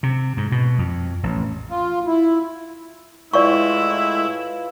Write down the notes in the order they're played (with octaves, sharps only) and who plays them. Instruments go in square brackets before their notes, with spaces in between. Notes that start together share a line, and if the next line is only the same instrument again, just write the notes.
[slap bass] C3
G#2
B2
F2
A1
[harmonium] F4
E4
[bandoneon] A2 G#3 A3 [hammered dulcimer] E3 F4 [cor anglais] E4 [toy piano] D5 C#6